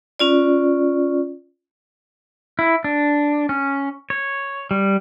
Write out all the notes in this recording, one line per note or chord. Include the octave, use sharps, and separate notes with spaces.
C#4 F4 D5
E4
D4
C#4
C#5
G3